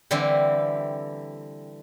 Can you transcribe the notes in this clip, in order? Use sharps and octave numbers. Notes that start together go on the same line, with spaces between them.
D3 E3 G3 C4 E4